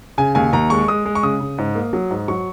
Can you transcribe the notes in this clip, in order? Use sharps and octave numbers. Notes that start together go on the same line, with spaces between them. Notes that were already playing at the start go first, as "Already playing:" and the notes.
C#3 G#5
D#2 G#5
D#2 A#5
G#3 C#6
G#3 D#6
G#3
C#6
C#3 D#6
C#3
G#2
A#3
F#3
G#2
F#3 C#6